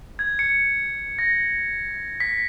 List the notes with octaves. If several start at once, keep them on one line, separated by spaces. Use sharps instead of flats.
G#6
C#7
A#6
B6